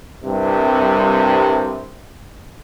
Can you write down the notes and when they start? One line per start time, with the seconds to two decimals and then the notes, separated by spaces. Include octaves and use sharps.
0.24 C2 G2 C3